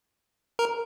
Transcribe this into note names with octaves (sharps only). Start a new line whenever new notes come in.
A#4